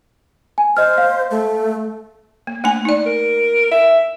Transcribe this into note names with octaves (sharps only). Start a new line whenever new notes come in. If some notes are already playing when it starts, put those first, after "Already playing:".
G#5
C5 D#5 F6
F5
A3
A#3
A3 D4 G#5
D#4 D5
A#4
E5